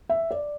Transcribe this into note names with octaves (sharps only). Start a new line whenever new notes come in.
E5
D5